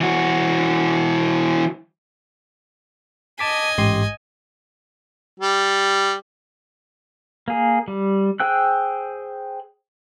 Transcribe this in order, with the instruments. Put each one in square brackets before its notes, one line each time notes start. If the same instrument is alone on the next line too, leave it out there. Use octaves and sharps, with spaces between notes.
[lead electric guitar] E3 F#4
[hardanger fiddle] D#5 G#5 [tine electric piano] A5 D6 B6
[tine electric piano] A1 G4 C6 [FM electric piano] G#2
[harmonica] G3
[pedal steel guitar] A#3 G#4
G3
G#4 C5 G5 E6 F#6